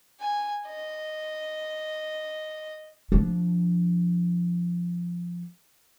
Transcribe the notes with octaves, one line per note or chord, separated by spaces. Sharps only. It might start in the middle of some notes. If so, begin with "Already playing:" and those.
G#5
D#5
F3 D4